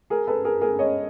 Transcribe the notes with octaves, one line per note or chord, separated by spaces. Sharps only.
G#4 A#4
A4 B4
G#4 A#4
G#4 A#4
C#5 D#5